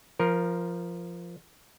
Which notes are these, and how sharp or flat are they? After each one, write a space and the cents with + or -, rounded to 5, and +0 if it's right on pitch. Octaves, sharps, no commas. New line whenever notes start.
F3 -10 A#4 +10